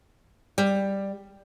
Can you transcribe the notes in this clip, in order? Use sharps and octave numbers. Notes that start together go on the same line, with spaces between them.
G3